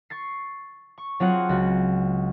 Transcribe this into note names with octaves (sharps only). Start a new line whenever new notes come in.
C#6 A6 C7
C#6
F#3 C4 F4 G#4 C#5 F#5
C#2 F#4